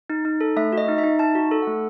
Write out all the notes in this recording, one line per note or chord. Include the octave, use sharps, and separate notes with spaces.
D#4
D#4
A4
A3 E5
F#4
D#5
D#4
E5
D#4
D#4 A5
F#4
A4
A3 F#5